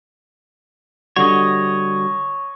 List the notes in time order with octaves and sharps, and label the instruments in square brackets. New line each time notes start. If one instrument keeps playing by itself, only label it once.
[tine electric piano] D3 G3 F#4 [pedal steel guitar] C#5 D#5